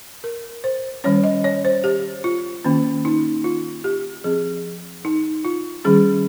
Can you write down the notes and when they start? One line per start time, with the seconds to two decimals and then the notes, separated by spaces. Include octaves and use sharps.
0.24 A#4
0.64 C5
1.04 D#3 G3 C#4 C#5
1.23 D#5
1.44 C#5
1.65 C5
1.84 G4
2.24 F4
2.65 D#3 A#3 C#4
3.05 D#4
3.44 F4
3.84 G4
4.24 F3 C4 G#4
5.05 D#4
5.45 F4
5.85 D#3 G3 C#4 G#4